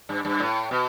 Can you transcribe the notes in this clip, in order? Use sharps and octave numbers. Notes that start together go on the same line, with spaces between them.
G2
G2
A2
B2